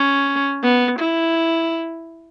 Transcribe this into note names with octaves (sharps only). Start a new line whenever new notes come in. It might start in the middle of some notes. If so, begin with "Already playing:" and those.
Already playing: C#4
B3
E4